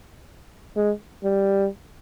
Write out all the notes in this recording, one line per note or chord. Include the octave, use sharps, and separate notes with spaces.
G#3
G3